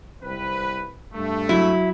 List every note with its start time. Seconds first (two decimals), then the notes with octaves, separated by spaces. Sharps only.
0.22 C2 C4 B4
1.13 G2 A3
1.49 F#3 E4